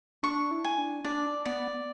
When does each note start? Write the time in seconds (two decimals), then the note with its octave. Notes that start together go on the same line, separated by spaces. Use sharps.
0.23 D4 C#6
0.51 E4
0.64 G#5
0.78 D4
1.05 D4 D5
1.45 B3 D5